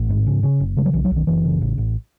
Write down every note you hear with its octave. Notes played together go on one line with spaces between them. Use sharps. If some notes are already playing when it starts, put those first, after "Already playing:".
Already playing: A1
G#2
C#3
C#3
F#1
C#3 G#3
F#3
B1 E3
F#3
B1
D#3
F#1 E3
C#3
A1
A1